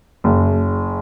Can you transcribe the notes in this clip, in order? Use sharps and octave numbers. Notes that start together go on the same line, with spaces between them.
F#1